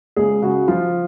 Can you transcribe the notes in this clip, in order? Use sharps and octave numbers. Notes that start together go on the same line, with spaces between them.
C#2 G#4
C#3 F#4
F3 F4